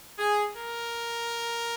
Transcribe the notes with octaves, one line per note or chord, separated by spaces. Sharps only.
G#4
A#4